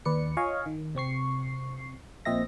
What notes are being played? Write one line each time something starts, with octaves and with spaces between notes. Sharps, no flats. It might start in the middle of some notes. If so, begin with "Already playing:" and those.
D#2 B4 D5 C#7
F4 C#5 D#5 F5 G#5 C#6
D#3
C3 C4 C#6 C7
A#1 A#2 C4 D#5 E5 A#6